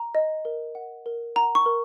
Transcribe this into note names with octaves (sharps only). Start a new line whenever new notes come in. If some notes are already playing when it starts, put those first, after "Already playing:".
Already playing: A#5
D#5
A#4
F#5
A#4
F#5 A#5
C#6
A#4